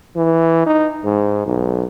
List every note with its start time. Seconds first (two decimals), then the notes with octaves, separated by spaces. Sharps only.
0.16 E3
0.66 D#4
1.04 G#2
1.46 B1